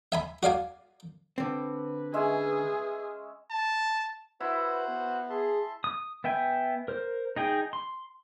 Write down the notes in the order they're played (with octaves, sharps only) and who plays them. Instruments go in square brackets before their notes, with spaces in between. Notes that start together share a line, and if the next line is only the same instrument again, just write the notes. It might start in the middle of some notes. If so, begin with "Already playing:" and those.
[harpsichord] E5 G#5 B5
F#4 D5 F5 G#5
[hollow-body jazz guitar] D3 C4 [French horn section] B4
[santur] G#3 C#4 E5 [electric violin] G#4
[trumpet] A5
[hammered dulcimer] E4 [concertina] F#4 C5 F#5 [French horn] B4
[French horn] B3
[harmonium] G#4 [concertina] E5 A5 C6
[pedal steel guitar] D#6
B3 E5 G5 G#5
A#4 C5
D#4 G#4 G5
C6